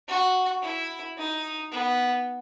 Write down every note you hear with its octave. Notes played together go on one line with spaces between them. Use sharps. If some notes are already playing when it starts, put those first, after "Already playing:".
F#4
E4
D#4
B3